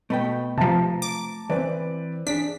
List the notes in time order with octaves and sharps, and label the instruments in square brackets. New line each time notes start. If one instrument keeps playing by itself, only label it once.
[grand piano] B2 [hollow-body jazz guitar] A3 B4 G5
[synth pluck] C3 F3 [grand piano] A5 A#5
[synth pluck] D6
[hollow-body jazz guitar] E3 [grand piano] C4 B4 D5
[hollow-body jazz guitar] D4 G#4 [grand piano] D5 [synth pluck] B6